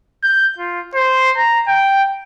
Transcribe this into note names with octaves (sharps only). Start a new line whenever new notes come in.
G6
F4
C5
A#5
G5